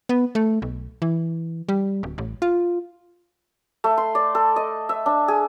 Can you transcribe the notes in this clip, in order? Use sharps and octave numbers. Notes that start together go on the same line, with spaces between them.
B3
A3
B1
E3
G3
D1
A1
F4
A3
C6
D5
A4
D#5
E5
D4
G#4